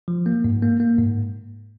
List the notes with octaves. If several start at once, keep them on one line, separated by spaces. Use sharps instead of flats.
F3
A#3
G#2
A#3
A#3
G#2